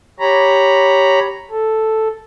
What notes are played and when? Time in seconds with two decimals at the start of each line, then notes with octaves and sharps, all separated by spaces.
0.20 G4 C#5 A#5 B5
1.51 A4